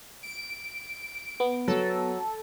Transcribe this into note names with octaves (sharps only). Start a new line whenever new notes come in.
D7
B3
F#3 A4